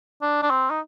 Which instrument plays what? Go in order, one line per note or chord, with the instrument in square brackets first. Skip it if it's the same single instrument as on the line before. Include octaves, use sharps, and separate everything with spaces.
[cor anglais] D4
D4
C4
D#4